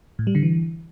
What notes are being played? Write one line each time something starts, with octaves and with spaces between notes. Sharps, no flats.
A2
G3
D3
E3